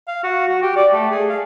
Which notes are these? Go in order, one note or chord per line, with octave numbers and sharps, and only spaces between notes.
F5
F#4
F#4
G4
D5
A3
G#4
F5